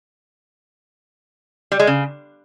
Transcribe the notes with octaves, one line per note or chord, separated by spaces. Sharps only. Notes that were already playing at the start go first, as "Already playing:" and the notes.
G3
G#3
C#3